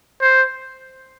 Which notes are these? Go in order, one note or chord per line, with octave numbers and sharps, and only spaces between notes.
C5